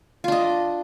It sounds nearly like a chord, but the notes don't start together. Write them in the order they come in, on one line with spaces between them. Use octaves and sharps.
F4 D4 D#5